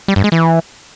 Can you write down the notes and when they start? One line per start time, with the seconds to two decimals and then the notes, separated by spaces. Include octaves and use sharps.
0.08 G3
0.16 G2
0.24 G#3
0.32 E3